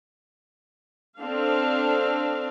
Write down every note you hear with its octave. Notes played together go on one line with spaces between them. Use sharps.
C4 D4 A4 F5